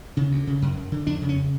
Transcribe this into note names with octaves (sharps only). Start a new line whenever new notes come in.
C#3 C#4
D2
C#3
F#2
F#2
D3
F2 D4
C#3
C#4